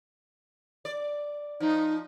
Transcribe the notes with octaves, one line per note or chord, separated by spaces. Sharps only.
D5
F3 D#4